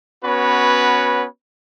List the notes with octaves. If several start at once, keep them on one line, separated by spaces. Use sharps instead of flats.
B3 C#4 F#4 B4 C#5